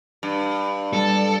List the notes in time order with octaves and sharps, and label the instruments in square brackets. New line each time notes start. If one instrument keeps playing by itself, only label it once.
[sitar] G2
[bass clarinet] G3 [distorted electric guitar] A4